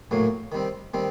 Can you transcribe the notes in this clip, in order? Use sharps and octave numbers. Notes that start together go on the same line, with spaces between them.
A#1 A2 F#3 A#3
D#3 G3 C4
D#3 G3 C4